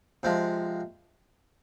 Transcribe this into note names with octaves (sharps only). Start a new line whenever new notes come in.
C3 F3 G#3